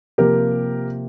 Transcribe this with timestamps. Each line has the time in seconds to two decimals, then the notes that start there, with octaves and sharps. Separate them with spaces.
0.18 C3 F3 A#3 G4 A#4